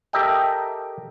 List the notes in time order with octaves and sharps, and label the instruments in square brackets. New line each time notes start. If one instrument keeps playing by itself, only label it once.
[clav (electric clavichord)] G4 A4 A#4 D#5 E5 G5